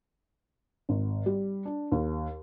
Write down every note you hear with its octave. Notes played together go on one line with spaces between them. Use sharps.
G#1
G3
D4
D#2